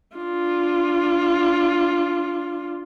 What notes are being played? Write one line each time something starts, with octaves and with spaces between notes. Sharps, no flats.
D4 F4